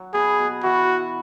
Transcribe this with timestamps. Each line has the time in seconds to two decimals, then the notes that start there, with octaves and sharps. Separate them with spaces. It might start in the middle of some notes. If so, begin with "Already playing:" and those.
Already playing: F#3
0.14 B2 G#4
0.39 B2
0.63 E3 F#4